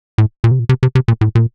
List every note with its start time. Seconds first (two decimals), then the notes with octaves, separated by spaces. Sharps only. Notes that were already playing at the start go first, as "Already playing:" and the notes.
0.18 A2
0.44 A#2
0.51 C3
0.59 A#2
0.69 C3
0.83 C3
0.95 C3
1.08 A#2
1.21 A2
1.35 A#2